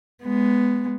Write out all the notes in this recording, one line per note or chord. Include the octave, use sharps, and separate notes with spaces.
G#3 B3